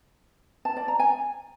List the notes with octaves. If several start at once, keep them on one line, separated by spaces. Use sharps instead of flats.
A5
D5
A#5
G#5